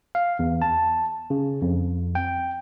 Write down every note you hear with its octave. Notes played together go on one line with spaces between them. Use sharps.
F5
E2
A5
C#3
F2
G5